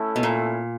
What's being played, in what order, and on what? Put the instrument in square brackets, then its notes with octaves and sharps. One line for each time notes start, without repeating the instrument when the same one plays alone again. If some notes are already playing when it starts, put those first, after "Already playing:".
Already playing: [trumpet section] A3 C#4 E4 A4
[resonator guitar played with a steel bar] B2
A#2